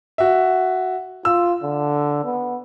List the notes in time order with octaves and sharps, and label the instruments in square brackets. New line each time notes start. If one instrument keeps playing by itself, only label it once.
[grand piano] F#4 E5
[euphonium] F4 [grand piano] E6
[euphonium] D3
B3